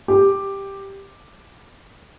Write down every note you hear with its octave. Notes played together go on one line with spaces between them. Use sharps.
G4